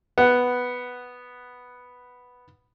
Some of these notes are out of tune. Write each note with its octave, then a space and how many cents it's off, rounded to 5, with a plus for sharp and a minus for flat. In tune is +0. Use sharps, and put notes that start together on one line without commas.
B3 +0 F#5 +5